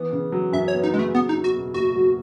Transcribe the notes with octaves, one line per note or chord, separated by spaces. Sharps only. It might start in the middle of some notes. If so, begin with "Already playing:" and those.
Already playing: E3 B3
C#3
F#3
F#2 E5
C#5
B3
D#4
C#3 G#3
A3
F#3 B3
D#4
E2
F#4
B2
F#1 F#4
F#3